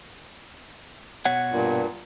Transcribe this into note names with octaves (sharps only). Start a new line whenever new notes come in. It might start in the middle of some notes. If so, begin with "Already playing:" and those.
B2 C#5 F#5
G2 A#2